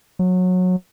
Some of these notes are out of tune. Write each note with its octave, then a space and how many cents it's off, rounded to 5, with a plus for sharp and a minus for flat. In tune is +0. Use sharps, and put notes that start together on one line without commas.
F#3 -20